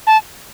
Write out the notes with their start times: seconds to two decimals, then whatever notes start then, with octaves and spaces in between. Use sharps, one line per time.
0.07 A5